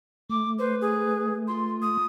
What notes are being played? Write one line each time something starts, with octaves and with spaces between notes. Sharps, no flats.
A3 D6
B4 C5
G#4
F4 C6
D#6